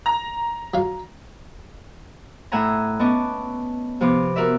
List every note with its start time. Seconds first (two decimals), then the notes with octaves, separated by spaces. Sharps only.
0.06 A#5
0.74 F#3 F5
2.52 A2 E5 F#5 G#5 A#5
2.99 B3 C#4 D#5 A5 C#6 D6
4.01 C3 F3 B3 D6
4.36 F#4 A#4 D5 E5